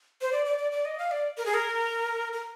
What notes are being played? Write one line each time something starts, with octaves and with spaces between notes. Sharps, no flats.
C5
D5
D5
D5
D5
D#5
F5
D5
A#4
G#4
A#4
A#4